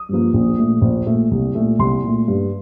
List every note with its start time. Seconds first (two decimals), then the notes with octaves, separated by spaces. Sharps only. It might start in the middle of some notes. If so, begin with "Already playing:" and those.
Already playing: D#6
0.09 G2 F3 A#3
0.34 A#1
0.57 A#2 A3
0.82 A#1
1.06 A#2 A3
1.31 C2
1.55 A#2 A3
1.79 C2 C6
2.03 A#2 A3
2.28 G2